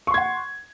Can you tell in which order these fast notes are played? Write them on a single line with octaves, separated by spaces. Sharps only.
C#6 C6 G#6 F#5